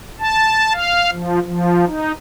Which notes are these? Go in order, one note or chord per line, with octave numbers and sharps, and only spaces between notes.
A5
F5
F3
F3
D#4